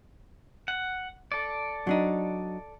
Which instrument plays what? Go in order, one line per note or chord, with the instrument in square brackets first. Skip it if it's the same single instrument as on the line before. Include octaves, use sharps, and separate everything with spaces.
[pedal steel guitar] F#5
A4 D5
[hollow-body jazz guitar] F#3 D4 D#4